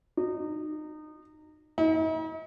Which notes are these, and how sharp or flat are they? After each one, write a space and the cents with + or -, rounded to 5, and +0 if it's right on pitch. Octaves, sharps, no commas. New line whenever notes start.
D#4 -25
D#4 +45